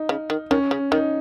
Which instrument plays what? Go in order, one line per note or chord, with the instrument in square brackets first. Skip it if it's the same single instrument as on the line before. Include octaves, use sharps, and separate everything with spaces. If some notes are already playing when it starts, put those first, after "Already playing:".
Already playing: [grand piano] D#4
[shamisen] C#3
D#3
[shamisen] D#3 [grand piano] C#4
[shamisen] C#3
[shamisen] D#3 [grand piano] D#4